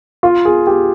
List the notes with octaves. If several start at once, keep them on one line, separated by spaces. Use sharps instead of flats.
F4
G#4
G4